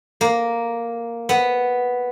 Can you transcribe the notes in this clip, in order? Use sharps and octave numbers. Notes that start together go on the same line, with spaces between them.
A#3
B3